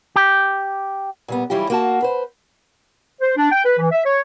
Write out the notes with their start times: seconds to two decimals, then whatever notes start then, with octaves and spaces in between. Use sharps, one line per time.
0.16 G4
1.28 A#2 G3 B3
1.50 E3 F#3 G3 E4 F4 G4
1.70 A#3 F#4 A5
2.02 B4 C5
3.21 C5
3.37 D4
3.52 G5
3.65 B4
3.78 E3
3.91 E5
4.05 C#5